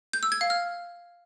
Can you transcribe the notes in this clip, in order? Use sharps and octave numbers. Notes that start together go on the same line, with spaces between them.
G6
E6
G#6
F5
F6